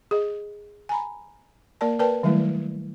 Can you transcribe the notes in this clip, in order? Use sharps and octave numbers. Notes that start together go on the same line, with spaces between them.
G#4 D#5
G#5 A#5 B5
A#3 A#4 D5 A5
A#4 B4 D5 G5 A5
D#3 F#3 G3 A3 E4